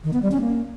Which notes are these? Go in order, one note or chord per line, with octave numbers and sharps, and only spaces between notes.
D#3
B3
G3
C#4
A#3